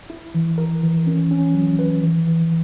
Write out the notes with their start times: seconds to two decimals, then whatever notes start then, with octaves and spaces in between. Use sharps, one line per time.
0.10 E4
0.34 E3
0.58 A#4
0.83 E3
1.07 C#4
1.31 C#4
1.54 F#3
1.79 B4
2.03 E3
2.27 E3